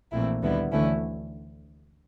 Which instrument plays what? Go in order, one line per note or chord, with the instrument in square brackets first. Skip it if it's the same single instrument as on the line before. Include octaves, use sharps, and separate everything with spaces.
[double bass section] A#1 A#2 [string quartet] E3 A3 C4 E4
[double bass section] D2 D3 [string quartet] D#3 G3 B3 E4
[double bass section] D2 D3 [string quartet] E3 A3 C#4 E4